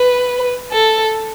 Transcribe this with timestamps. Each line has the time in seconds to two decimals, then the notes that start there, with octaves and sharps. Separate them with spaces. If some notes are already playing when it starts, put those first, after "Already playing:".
Already playing: B4
0.72 A4